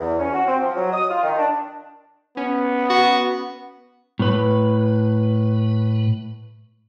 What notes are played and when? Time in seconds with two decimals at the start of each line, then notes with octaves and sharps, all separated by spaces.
0.01 E2
0.19 C#4
0.33 F#4
0.47 C4
0.61 F3
0.76 F#3
0.92 D#6
1.11 F4
1.24 D#3
1.38 D4
2.37 B3 C#4
2.90 F#4
4.19 A2 B4